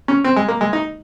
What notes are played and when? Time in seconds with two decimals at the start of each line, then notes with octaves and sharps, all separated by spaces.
0.08 C#4
0.24 C4
0.36 G#3
0.48 A#3
0.61 G#3
0.73 D#4